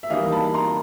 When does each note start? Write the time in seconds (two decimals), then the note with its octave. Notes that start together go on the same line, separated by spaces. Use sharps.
0.03 E5
0.10 E3 G3 A#3 D#4 D#5 F5
0.32 A5 B5
0.54 A#5 C6